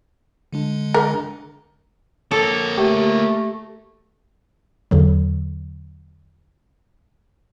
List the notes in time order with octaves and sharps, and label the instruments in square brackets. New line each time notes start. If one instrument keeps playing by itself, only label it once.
[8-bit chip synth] D3 G#3 D4
[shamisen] A#4
[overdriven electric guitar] A#3 C#5 [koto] A4
[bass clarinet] A3 [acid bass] G4
[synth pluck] E2 D3 F#3